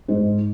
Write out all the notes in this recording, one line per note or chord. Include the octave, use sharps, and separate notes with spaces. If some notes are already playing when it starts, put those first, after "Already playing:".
G#2